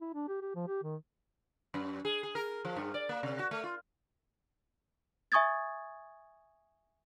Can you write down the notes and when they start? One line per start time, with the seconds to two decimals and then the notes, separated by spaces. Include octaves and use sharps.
0.01 E4
0.14 D4
0.28 G4
0.42 G4
0.55 F3
0.68 G4
0.83 D#3
1.74 F#2
2.05 G#4
2.23 G#4
2.35 A#4
2.65 F3
2.76 G2
2.94 D5
3.09 A#3
3.23 C3
3.39 F#4
3.51 A3
3.63 F4
5.32 E5 G#5 C#6 D#6 G#6 A6